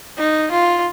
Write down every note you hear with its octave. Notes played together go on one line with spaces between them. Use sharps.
D#4
F4